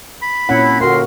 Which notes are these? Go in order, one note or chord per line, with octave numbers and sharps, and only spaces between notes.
B5
A#2 F#3 C4 C#4 E4 F#5
A2 D3 A#3 F#4 A#4 C6